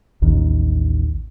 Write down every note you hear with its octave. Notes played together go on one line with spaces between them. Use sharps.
A1 D#2 D#3